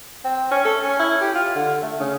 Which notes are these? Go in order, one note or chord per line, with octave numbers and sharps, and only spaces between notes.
C4
C#4
A4
C#4
E4
G4
F4
D3
A3
C#3